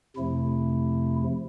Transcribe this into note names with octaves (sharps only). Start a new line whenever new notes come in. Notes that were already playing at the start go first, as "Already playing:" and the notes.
F2 C3 F3 A3 E4